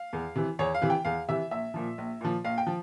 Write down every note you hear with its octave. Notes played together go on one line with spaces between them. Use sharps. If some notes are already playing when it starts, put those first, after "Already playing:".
Already playing: F5
E2
C3 E3
E2 C#5
F5
C3 E3
G5
E2 F5
C3 E3 E5
A#1 E5
A#2 F3
A#1
A#2 F3
A#1 F5
G5
F3